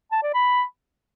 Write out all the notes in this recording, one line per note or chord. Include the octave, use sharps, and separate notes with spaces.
A5
D5
B5